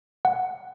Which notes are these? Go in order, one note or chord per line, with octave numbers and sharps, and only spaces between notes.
F#5